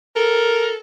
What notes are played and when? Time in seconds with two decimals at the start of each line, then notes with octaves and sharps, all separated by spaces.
0.16 A4 A#4